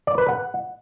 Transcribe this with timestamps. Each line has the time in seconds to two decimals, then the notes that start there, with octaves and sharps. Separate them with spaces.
0.07 D5
0.18 B4
0.29 F#5